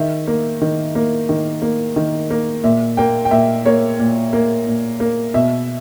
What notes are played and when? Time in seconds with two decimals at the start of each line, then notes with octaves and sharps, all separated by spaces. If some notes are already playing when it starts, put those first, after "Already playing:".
Already playing: D#3 E5
0.27 A#3
0.62 D#3
0.95 A#3
1.29 D#3
1.62 A#3
1.96 D#3
2.31 A#3
2.63 A#2 E5
2.97 A#3 G5
3.25 G5
3.31 A#2 E5
3.65 A#3 C#5
3.99 A#2
4.33 A#3
4.66 A#2
5.00 A#3
5.34 B2 E5